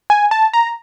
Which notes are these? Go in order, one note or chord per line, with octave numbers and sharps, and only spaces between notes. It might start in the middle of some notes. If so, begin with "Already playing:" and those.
G#5
A5
A#5